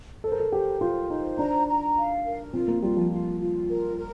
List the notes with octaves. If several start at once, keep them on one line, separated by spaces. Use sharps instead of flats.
A4 C5
A#4
A4
G4 C5
F4 C5
D#4 C5
D4 A#5
A#5
F5
A#4
C4 F4
A#3
G3 F4
F3
F4
F4
A#4
A#4